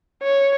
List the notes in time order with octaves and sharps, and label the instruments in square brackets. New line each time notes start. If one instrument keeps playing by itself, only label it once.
[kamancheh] C#5